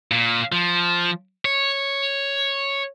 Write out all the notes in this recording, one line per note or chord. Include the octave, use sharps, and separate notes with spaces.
A#2
F3
C#5